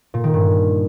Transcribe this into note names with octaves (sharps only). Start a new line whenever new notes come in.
A#2
D#3
G2